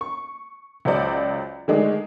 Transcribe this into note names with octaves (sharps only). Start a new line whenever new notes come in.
C#6
C#2 F#3 C5 D5
D3 D#3 G#3 A3 D4 G#4